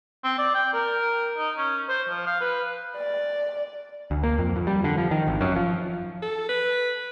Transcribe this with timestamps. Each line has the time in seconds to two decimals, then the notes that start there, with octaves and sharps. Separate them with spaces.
0.24 C4
0.39 D5
0.54 G5
0.73 A#4
1.38 D#4
1.57 C#4
1.89 C5
2.09 F3
2.27 F5
2.41 B4
2.97 D5
4.11 D2
4.23 A#3
4.38 F2
4.56 F2
4.67 G3
4.84 D3
4.98 F3
5.11 D#3
5.27 G#1
5.41 F#2
5.56 F3
6.22 A4
6.49 B4